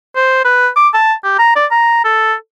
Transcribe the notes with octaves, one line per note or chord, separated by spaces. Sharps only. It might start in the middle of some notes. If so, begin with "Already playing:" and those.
C5
B4
D6
A5
G4
A#5
D5
A#5
A4